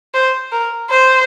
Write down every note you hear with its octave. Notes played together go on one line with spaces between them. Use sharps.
C5
A#4
C5